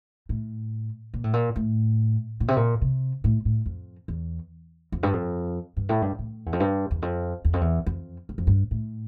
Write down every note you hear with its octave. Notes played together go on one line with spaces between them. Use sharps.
A2
A#2
A2
A#2
A2
A#2
C3
A#2
C3
A2
A2
F2
E2
F2
G2
F2
G2
A2
G2
A2
E2
F2
G2
E2
F2
E2
F2
E2
F2
G2
F2
G2
A2